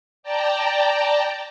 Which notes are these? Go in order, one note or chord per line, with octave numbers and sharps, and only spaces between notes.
D5 G5 A5 A#5